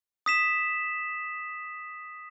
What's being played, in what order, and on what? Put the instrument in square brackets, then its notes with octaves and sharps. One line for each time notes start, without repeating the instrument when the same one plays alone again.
[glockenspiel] D#6 B6 E7